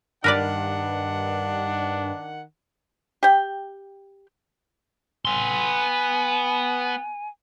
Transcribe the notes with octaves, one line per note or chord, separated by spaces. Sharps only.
G2 D#3 D4 A#4 B4 D5 F#5
G4 G5
B3 G#5 C6